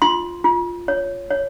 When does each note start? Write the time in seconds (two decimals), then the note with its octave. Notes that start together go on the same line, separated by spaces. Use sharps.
0.02 F4 C6
0.44 F4
0.88 C#5
1.30 C#5